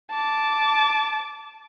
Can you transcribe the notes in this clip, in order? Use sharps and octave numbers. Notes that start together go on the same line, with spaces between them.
A5 D6